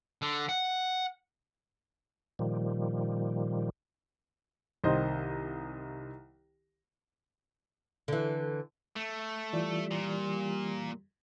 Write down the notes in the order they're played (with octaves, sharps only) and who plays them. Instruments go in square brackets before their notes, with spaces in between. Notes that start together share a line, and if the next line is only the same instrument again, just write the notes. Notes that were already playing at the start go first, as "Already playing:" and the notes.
[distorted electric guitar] D3
F#5
[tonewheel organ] A#2 D#3 F3 G3
[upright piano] C2 D#3 C5 D#5
[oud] D3 E3
[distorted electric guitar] A3
[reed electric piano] E3 F4 D5 [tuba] G3
[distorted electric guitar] A#2